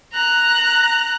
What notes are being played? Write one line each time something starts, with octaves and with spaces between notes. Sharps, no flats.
A#5 F#6